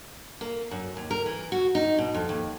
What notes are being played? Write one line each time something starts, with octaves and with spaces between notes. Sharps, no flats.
A#3
F#2
D#2
A#4
E3
F#4
D#4
B2
F2
D#2